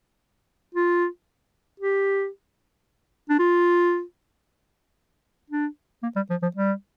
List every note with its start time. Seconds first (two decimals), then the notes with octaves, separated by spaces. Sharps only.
0.75 F4
1.80 G4
3.30 D4
3.39 F4
5.50 D4
6.03 A#3
6.16 G3
6.30 F3
6.43 F3
6.56 G3